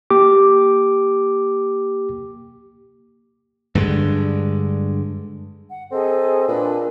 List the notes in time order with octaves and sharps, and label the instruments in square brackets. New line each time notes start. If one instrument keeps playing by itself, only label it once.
[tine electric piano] A#3 G4 D6
[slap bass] G2 D3 G#3
[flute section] F#5
[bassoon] C4 [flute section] G#4 A4 D#5
[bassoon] A#2 [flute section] D4 B4 E6